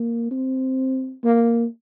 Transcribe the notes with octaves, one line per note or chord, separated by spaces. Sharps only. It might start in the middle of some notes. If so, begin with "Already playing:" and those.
Already playing: A#3
C4
A#3